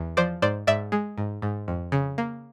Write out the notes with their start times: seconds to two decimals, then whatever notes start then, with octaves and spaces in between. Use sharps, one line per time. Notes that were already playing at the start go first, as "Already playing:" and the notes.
Already playing: E2
0.17 F3 C5 D5
0.42 G#2 C5 D5
0.67 G#2 D5 E5
0.92 G#3
1.18 G#2
1.42 G#2
1.68 F2
1.92 C#3
2.18 A#3